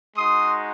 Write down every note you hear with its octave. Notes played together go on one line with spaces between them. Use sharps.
G#3 D#4 F#4 C6 D#6